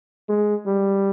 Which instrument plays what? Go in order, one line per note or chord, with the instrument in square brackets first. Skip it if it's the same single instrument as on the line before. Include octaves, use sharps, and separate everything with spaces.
[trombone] G#3
G3